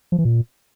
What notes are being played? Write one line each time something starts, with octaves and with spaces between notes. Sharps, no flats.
F3
E3
A#2